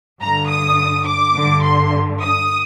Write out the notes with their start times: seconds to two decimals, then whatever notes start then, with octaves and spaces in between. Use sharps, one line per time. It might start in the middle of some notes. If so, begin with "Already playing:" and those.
0.21 G2 D3 A#5
0.50 D#6
1.07 D6
1.35 G2 D3
1.64 C6
2.21 D#6